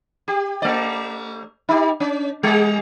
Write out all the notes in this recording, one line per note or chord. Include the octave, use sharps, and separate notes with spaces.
G4
A3 D5
D#4 G4
C#4
G3 G#4